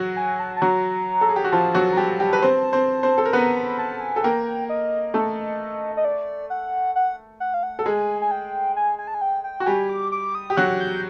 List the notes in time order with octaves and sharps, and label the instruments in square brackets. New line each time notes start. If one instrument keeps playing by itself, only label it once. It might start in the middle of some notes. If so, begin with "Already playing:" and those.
Already playing: [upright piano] F#3 F#4
[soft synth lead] G#5
A5
A5
[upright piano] F#3 F#4 [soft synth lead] A#5
[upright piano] A4
G#4
G4
F#4
[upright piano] F3 F4 [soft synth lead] A5
[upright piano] F#3 F#4
[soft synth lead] A#5
[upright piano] G3 G4 [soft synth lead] A5
[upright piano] G3 G4
B4
C4 C5
C4 C5
C4 C5
A4
A#4
[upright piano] B3 B4 [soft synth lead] A#5
[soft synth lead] B5
A5
G#5
[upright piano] A4
[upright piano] A#3 A#4 [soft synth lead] G5
[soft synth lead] D#5
[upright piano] A3 A4
[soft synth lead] D#5
D5
F#5
F#5
F#5
F5
F#5
[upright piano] A4
[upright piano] G#3 G#4 [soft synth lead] G#5
[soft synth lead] G#5
G5
G#5
G#5
A5
G#5
G5
G5
[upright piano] F#4
[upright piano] G3 G4 [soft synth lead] G#5
[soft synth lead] D6
D6
D#6
[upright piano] G4
[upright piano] F#3 F#4 [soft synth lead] F#6
[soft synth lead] G6